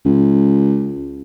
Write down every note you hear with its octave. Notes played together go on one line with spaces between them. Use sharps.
C#2